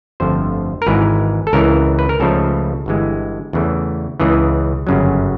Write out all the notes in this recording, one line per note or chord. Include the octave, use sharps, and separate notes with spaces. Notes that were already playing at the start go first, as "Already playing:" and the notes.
G1 F2 D3 F3 A3 C5
A#4
G#1 G#2 E3 G#3 B4
A4
C#2 C#3 E3 A#4
B4
A#4
C#2 C#3 F3 A3 A4
G1 G2 E3 G#3
E2 C#3 E3 A3
C#2 C#3 E3 G#4
G1 F#2 C#3 F#3